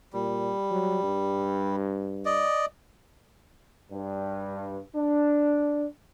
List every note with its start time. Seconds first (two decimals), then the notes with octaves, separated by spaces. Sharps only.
0.14 A#2 G3
0.71 F#3
1.03 G2
2.25 D5 D#5
3.91 G2
4.96 D4